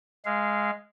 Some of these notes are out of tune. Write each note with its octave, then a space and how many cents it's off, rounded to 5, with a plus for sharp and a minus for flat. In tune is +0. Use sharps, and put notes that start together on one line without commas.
G#3 +0 F5 -25